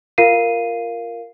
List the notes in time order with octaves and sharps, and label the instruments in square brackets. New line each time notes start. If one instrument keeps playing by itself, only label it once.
[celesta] F4 A#4 F5 C7 D#7